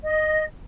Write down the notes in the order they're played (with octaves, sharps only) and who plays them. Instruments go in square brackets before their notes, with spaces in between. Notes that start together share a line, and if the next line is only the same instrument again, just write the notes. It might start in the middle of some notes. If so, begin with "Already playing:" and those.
[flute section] D#5